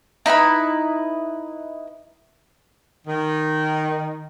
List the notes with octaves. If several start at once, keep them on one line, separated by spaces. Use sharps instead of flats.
D#4 E4 B4 B5
D#3